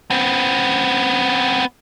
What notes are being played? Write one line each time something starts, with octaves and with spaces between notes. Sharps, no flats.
B3 C4